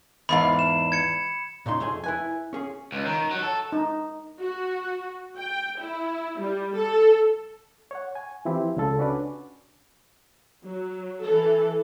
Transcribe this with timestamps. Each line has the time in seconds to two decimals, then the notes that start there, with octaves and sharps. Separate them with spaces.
0.29 E2 G#2 F5 B5
0.59 E7
0.92 G#6 C#7
1.66 A#2 C#3 D#4 C6
1.80 F2 A3 G#4 G#5
2.04 E4 B4 G#5
2.53 C#4 G#4
2.92 C#2
3.06 D#3
3.31 F#3
3.43 A4
3.72 D#4
4.40 F#4
5.39 G5
5.80 E4
6.40 G3
6.76 A4
7.91 C#5 F#5
8.15 G#5
8.45 E3 F3 C4 E4 G4
8.77 C#2 C#3 F4 A4
8.99 C#4 D4 F#4 B4 D5
10.63 F#3
11.23 E3 A4